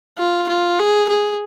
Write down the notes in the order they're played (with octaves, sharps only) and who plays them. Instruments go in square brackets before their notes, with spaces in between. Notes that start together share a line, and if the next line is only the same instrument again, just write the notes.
[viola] F4
F4
G#4
G#4